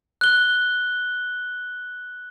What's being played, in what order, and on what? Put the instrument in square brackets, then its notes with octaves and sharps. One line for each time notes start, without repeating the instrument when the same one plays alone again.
[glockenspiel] F#6 G7